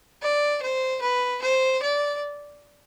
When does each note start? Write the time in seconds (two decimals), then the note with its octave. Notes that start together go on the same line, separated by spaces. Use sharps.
0.22 D5
0.62 C5
1.02 B4
1.42 C5
1.82 D5